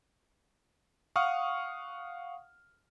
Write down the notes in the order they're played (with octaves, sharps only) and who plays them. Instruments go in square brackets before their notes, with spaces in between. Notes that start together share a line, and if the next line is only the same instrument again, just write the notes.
[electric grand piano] F5 F#5 C#6 D#6 F6